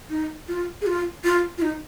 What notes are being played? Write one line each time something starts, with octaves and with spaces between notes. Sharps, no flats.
D#4
F4
G#4
F4
F4
F4
D#4